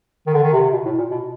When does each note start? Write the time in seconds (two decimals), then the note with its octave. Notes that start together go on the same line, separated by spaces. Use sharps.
0.27 D#3
0.34 D3
0.43 D#3
0.53 C3
0.63 C3
0.72 B2
0.85 A2
0.98 A#2
1.11 B2